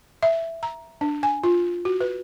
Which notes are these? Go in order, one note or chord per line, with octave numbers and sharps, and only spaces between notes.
E5
A#5
D4
G#5
F4
F#4
B4